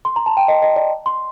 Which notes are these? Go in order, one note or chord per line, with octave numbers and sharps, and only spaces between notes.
C6
A#5
A5
G5
D#5
D#5
D5
C6